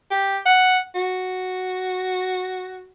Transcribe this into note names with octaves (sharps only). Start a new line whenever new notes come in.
G4
F#5
F#4